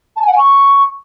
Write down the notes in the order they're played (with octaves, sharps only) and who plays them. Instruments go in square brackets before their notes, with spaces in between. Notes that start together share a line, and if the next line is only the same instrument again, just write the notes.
[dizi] A5
G#5
F#5
G#5
C#6